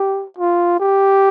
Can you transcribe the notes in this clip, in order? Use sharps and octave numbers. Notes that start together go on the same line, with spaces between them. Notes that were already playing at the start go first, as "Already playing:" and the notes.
Already playing: G4
F4
G4